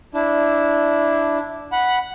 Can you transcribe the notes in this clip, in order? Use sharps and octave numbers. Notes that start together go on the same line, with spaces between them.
D4 E4
F#5 B5